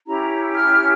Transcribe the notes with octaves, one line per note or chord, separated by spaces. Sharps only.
C#4 E4 G4 A#5
F6